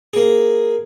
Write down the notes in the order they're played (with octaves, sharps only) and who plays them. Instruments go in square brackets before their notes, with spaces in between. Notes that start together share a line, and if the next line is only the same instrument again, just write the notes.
[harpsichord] A#3 G#4